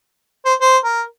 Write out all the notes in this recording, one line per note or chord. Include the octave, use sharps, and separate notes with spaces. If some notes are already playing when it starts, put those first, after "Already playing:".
C5
C5
A#4